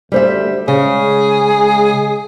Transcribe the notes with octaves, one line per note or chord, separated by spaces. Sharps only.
D2 G3 C5 E5
C#3 G#3 G#4
G#3